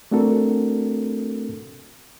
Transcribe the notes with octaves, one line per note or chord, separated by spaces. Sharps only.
A3 C4 D4 F#4 A4 A#4